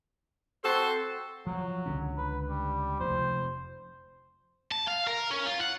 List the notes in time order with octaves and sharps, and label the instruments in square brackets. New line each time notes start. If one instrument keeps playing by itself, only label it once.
[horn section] C4 F#4 C5 [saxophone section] A4
[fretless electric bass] F3 [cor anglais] F#3
[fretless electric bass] C#2 D3 C#4
[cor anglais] B4
G3
[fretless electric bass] F1 F3 [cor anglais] C5
[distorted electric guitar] A5
F5
A#4
C#4
F4
F#5